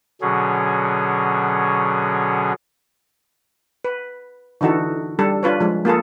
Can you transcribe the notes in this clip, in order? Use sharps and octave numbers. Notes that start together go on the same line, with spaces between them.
B2 D3 F#3 C#4 G#4
B4
D3 E3 D#4 F#4 A4
G3 D4 A4
D4 F4 B4 C#5
F3 G#3
A#3 F4 G#4 A4